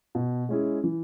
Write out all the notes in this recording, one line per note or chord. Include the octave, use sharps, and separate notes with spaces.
B2
G#3 C#4 E4 G#4
E3